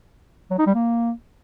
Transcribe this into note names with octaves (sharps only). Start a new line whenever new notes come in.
F#3
D#4
G3
A#3